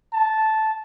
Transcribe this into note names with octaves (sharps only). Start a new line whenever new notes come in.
A5